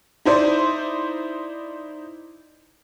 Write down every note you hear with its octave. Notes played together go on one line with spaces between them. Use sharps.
D#4 E4 C5 D5